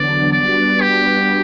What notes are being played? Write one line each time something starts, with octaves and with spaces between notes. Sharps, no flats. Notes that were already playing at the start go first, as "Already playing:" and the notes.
Already playing: E2 D3 F#3 B3 D4 D5
G3 B3 D4 F#4 B4 D5
G4